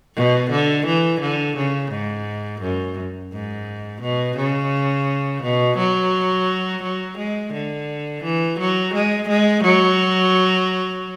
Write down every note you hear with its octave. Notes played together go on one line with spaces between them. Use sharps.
B2
D3
E3
D3
C#3
G#2
F#2
G#2
B2
C#3
B2
F#3
F#3
G#3
D3
E3
F#3
G#3
G#3
F#3